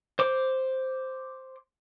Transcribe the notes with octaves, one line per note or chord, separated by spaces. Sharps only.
C5 D6